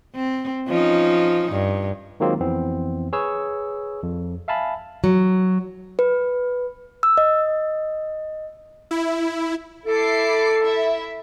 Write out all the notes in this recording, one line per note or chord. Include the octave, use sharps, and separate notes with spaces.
C4
F3 C#4 D#4
G2
D#3 F#3 G#3 A#3 C4 F4
F2 E3 B3 C4
G#4 B4 C#5 E6
F2
E5 F5 G#5 A5 B5
F#3
B4
E6
D#5
E4
E4 A4 D6 C7
E4 E5